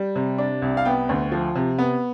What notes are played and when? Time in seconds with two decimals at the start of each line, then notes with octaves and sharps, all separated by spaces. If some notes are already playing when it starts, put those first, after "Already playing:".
Already playing: G3
0.16 C3
0.38 D4
0.62 C2
0.77 F5
0.85 B3 G5
1.09 D2
1.32 F3
1.55 C3
1.78 B3